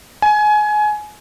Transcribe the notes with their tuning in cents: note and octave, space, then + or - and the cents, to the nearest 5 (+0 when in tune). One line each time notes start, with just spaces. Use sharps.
G#5 +25